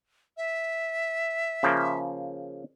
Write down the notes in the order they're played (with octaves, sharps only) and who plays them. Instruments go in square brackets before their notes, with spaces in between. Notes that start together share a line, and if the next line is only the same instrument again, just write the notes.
[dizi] E5
[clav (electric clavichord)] C#3 F3 A#3